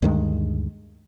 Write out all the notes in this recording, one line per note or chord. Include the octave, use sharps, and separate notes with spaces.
D2 G2 D#3 G#3